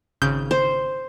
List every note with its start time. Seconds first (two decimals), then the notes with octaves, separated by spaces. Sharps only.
0.22 G#1 C#3 G6
0.51 C5